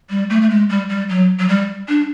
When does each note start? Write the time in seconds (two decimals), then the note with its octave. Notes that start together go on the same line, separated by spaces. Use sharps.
0.10 G3
0.30 A3
0.42 A3
0.50 G#3
0.69 G3
0.89 G3
1.09 F#3
1.39 F#3
1.48 G3
1.88 D4